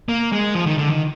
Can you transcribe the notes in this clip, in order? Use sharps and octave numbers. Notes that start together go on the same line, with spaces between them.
A#3
G#3
F3
D#3
D3
D#3